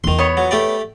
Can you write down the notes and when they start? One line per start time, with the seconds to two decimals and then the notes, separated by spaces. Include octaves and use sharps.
0.04 E2 D#3 F4 C6
0.19 B3 C#5
0.37 F#3
0.51 A3 G4 D5